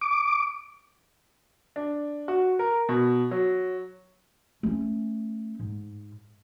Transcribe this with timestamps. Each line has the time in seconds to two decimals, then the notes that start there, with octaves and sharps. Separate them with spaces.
0.01 D6
1.76 D4
2.28 F#4
2.59 A#4
2.89 B2
3.31 F#3
4.63 A3 C#4
5.60 G#2